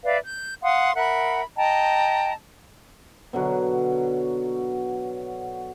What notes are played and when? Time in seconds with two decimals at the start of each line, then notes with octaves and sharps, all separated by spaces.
0.04 B4 D5 E5 F5
0.23 G6
0.63 F5 F#5 C6 D#6
0.96 A#4 E5 F#5 B5
1.56 D#5 G5 A5 A#5
3.33 B2 D3 F#3